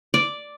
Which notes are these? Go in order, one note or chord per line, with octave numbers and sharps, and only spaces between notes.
D5